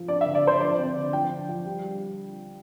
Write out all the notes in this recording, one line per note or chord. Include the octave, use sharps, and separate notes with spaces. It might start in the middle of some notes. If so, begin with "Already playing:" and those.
Already playing: F3
D4 D5
E5
D3
D5
D3 C5
F3 D5
C4
D3
F3 G5
D4
F3
G3
G3